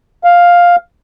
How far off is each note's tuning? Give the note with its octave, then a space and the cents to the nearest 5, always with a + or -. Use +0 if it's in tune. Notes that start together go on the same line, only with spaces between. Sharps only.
F5 +5